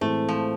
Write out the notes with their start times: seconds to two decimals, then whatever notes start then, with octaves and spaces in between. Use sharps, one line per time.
0.01 A2 E3 G#3 A3 C4
0.29 F3